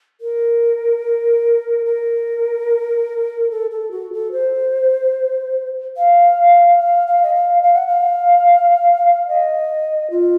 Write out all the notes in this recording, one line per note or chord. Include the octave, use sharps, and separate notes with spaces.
A#4
A#4
A4
A4
F#4
A4
C5
F5
F5
F5
D#5
F5
F5
F#5
F5
D#5
F4